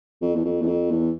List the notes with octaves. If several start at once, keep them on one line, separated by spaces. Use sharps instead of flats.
F2
E2
F2
E2
F2
E2